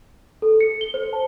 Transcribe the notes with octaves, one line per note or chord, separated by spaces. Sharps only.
A4
C#7
G7
C5
A5